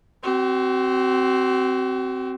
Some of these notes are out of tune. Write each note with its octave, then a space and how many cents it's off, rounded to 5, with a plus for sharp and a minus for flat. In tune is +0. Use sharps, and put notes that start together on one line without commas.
C4 +0 F#4 +35